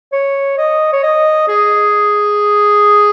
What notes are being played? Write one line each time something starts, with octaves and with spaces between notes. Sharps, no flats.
C#5
D#5
C#5
D#5
G#4